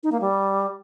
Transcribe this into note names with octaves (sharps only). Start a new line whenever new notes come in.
D#4
A#3
G3